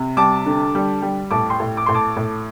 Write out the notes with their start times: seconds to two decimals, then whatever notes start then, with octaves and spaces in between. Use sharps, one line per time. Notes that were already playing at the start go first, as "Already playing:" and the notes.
Already playing: C3
0.17 G3 A5 D6
0.46 D3
0.75 G3
1.02 G3
1.31 A2 A5 D6
1.50 G5 C6
1.60 A2
1.77 D6
1.86 A2 C6
1.94 A5 D6
2.16 A2